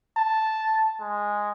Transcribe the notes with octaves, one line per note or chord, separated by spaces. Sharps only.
A5
G#3